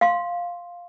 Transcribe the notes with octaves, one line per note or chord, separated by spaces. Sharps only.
F5 C6